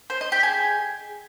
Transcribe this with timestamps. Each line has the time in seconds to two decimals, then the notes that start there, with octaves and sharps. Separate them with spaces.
0.10 C5
0.21 D#5
0.32 G4
0.43 G#4